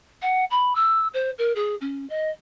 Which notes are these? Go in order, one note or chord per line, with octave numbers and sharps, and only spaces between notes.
F#5
B5
E6
C5
A#4
G#4
C#4
D#5